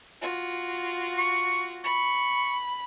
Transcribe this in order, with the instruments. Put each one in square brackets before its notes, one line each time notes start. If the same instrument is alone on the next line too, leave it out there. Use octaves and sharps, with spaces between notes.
[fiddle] F4 F#4
[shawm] C#6
[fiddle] B5 [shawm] C#6